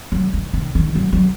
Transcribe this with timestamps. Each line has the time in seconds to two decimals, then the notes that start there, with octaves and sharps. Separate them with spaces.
0.12 F#3
0.33 D#3
0.53 D#3
0.75 D#3
0.95 F#3
1.12 F#3